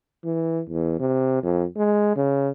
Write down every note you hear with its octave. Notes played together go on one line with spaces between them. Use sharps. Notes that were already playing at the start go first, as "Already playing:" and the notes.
E3
E2
C3
F2
G#3
C#3